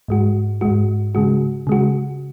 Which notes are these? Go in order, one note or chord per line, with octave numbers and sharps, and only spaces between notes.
G#2 G#3 F#4
G#2 G#3 F#4
C#3 G#3 F#4
C#3 G#3 F#4